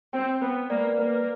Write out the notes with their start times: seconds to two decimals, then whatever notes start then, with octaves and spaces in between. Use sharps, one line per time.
0.13 C4 G5
0.42 B3 B4
0.70 A#3 D5
0.98 A#3 B4